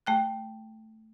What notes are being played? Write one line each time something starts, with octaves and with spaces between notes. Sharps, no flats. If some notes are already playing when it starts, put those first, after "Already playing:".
A3 G5 F#6